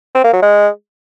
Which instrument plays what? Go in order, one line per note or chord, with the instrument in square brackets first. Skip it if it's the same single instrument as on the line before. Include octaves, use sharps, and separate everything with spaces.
[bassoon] C4
A#3
F#3
G#3